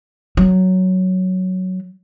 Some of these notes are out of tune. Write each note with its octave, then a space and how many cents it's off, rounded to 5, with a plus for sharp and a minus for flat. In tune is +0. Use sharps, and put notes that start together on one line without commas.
F#3 +5